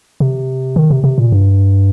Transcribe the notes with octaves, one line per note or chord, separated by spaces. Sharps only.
C3
D#3
C3
C3
A#2
G2